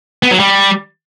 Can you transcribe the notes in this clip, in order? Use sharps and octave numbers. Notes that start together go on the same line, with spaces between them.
B3
F#3
G3